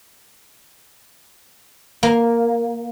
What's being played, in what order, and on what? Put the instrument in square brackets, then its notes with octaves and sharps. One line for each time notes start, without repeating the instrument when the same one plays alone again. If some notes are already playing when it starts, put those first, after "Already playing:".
[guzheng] A#3